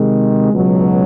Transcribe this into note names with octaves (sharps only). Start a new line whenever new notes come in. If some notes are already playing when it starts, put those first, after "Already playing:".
Already playing: C3 D#3 G#3
C#2 B2 F#3